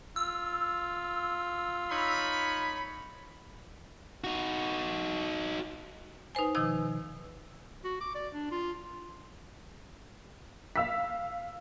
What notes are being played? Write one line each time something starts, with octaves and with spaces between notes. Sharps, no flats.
F4 E6
D#4 C#5 B5
D#4 F#4
D#4 B4 C5 G#5
B2 D#3 F3 D#5 E6
F#4
D6
D5
D4
F4
F5 E6 B6